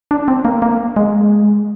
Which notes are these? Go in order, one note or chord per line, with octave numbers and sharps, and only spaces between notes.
D4
C4
A#3
A#3
G#3